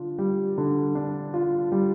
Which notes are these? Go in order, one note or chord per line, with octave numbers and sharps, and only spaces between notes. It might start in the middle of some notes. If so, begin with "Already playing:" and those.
Already playing: D3 D4 F4
G3
D3
D4
F4
G3